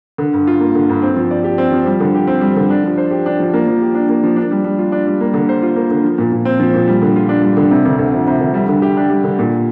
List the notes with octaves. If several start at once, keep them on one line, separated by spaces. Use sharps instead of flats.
D3
G2
F4
A#3
D3
G2
C4
F3
D5
G4
C4
F3
G3
D3
G4
C4
G3
D3
D4
F3
C5
G4
D4
F3
A#3
F3
G4
D4
A#3
F3
D4
G3
G3
F4
D4
G3
A#3
D3
C5
F4
A#3
D3
F3
A#2
A#2
C4
F3
A#2
G3
D3
F4
D4
G3
D3
C3
D2
D2
F3
C3
D2
G3
D3
G4
D4
G3
D3
A#2